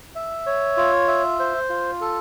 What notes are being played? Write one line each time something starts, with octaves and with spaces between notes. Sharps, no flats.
E5
C#5
F4
E5
C5
F4
A4